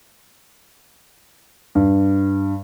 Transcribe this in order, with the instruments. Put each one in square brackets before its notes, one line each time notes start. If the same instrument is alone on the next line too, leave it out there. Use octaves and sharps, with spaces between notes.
[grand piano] G2